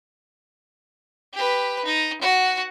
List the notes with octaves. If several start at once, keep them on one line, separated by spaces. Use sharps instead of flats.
G4 B4
D#4
F#4 F#5